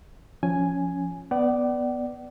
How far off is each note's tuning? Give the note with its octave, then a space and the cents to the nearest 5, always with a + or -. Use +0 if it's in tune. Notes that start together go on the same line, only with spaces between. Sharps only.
F3 +0 C#4 +5 G#5 +0
B3 +0 D5 +0 F#5 +45